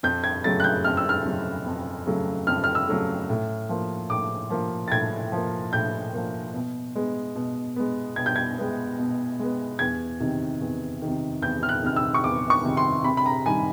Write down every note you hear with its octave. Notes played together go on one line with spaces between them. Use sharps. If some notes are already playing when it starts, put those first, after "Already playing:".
F2 G6
G#6
C#3 F#3 A3 A6
F#6
G6
F2 F6
E6
F6
C#3 F#3 A3
F2
C#3 F#3 A3
F2 F6
F6
E6
C#3 F#3 A3
A2
F3 A#3
A2 D6
F3 A#3
A6
A2 G#6
F3 A#3
A2 G6
F3 A#3
B2
G#3 B3
B2
G#3 B3
B2 G#6
G6
G#6
G#3 B3
B2
G#3 B3
E2 G#6
C3 D#3
E2
C3 D#3
E2 G6
F6
F#6
C3 D#3 F6
E6
C#6
E2 D6
C#6
C3 D#3
C6
C3 B5
B5
A#5
D#3 G3 G#5